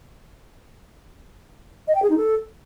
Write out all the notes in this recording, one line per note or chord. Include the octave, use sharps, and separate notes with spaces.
D#5
G5
G#4
D#4
A4